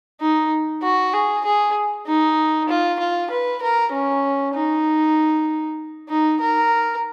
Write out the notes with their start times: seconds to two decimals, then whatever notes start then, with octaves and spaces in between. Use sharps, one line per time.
0.21 D#4
0.83 F#4
1.14 G#4
1.45 G#4
2.07 D#4
2.69 F4
2.99 F4
3.30 B4
3.62 A#4
3.92 C#4
4.54 D#4
6.09 D#4
6.41 A#4